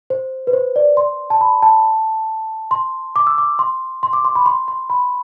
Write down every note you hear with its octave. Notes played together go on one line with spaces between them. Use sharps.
C5
B4
C5
D5
C6
A5
B5
A5
C6
D6
E6
D6
C6
C6
D6
C6
B5
C6
C6
B5